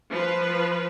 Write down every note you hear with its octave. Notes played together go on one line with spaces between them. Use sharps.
F3 B4